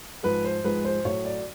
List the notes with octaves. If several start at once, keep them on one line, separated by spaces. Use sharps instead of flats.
G#2 F3 G#3 B4
C5
G#2 F3 G#3 B4
C5
A2 F#3 C#5
D5